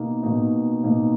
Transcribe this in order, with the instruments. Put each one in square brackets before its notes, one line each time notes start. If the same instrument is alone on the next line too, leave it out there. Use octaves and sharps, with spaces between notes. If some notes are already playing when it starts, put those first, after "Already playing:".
Already playing: [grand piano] B2 A#3 D#4
B2 A#3 D#4
B2 A#3 D#4